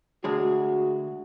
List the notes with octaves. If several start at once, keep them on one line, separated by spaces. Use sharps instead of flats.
D2 G#3 F#4 G#4